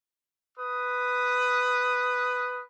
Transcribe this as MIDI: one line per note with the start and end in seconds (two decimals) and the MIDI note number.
0.58 2.62 71
0.58 2.62 87